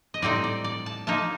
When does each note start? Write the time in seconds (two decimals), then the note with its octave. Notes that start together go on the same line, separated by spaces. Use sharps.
0.14 D#5
0.22 A2 G3 C4 D#4 D5
0.44 D5
0.64 D5
0.86 A5
1.07 F3 A#3 D#4 A5